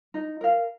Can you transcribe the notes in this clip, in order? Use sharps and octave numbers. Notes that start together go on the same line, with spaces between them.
D#4
A#4 F5